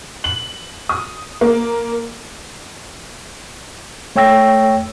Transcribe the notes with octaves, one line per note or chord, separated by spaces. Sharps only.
F#7
D#6
A#3
A3 C#5 G5 E6 A#6